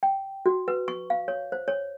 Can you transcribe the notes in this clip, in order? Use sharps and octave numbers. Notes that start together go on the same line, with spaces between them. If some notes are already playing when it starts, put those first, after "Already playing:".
G5
F#4
B4
C#6
F5
C#5
C5
C#5